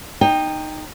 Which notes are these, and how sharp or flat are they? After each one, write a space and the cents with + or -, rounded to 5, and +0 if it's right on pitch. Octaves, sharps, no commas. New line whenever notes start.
D#4 -15 G5 +10